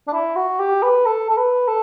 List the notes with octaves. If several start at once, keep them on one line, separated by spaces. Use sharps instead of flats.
D4
E4
F#4
G4
B4
A4
A4
B4
A4